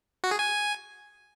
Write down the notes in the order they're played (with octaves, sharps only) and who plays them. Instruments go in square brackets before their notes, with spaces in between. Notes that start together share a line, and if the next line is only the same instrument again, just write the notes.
[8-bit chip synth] F#4
G#4
G#5